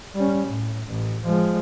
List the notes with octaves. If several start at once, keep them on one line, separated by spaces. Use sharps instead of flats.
G3 C#4
A2
A1
F3 G#3